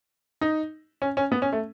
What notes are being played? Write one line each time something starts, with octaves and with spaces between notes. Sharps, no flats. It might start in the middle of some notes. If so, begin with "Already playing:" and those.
D#4
C#4
C#4
B3
C#4
A3